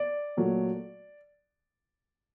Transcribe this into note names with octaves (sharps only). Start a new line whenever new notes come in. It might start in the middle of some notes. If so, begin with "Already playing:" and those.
Already playing: D5
A#2 F#3 A3